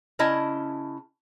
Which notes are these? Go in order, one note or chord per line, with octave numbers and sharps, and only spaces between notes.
C#3 C#4 E4 D#5 A5